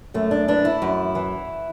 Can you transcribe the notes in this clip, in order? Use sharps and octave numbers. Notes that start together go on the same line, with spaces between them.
F#2 A3
D4
E3 D4
E4
F#2
E3